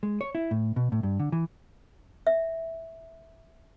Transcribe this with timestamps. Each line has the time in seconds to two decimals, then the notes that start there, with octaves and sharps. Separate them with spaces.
0.03 G#3
0.21 C#5
0.35 E4
0.51 A2
0.76 B2
0.92 A2
1.03 G2
1.20 D3
1.32 E3
2.27 E5